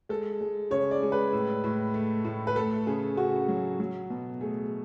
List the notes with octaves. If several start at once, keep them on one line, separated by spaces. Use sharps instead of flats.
G#3 A4
G#3
C#3 C#5
D5
G#3
B4
A2
A2
A3
A2
B4
A3 A4
C#3 G#4
C#3 F#4
F#3
F#3
B2
A3 G#4